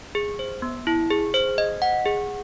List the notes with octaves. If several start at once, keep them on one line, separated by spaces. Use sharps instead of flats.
G#4
C5
B3
E4
G#4
C5
D#5
F#5
G#4